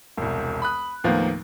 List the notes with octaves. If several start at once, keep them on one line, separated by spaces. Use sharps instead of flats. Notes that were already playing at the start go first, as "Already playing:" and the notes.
E1 C2
B5 D#6 F#6
D#2 A2 F3 A#3 B3 F5